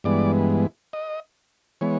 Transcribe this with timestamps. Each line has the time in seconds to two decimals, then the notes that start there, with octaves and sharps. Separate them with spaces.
0.04 G2 E3 G#3 B3 D5
0.93 D#5
1.81 E3 G#3 B3 C#5